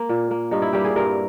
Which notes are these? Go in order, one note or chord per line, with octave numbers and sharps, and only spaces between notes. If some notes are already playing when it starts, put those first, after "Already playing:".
Already playing: A#3 A#4
A#2
A#3
G2 D#4
E4
G3 A#3 G4
G#4
G2 A#4